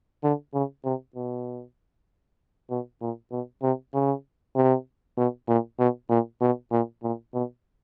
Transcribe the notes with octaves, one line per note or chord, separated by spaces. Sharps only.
D3
C#3
C3
B2
B2
A#2
B2
C3
C#3
C3
B2
A#2
B2
A#2
B2
A#2
A#2
B2